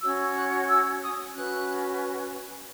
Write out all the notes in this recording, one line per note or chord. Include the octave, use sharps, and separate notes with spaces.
C#4 F#4 C#5 E6
F#6
E6
D#6
C#4 F#4 B4 F#6